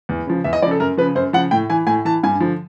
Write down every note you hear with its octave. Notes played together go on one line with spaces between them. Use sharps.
E2
C#3 F3
E2 E5
D#5
C#3 F3 D5
A4
F#2 A#4
C#3 F3 B4
F#2 C5
C#3 F3 F#5
A2 G5
E3 G#5
A2 G#5
E3 A5
G2 G#5
D3 F3